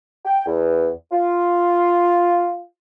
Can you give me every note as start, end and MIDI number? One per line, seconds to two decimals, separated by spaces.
0.25 0.43 79
0.46 0.89 40
1.12 2.64 65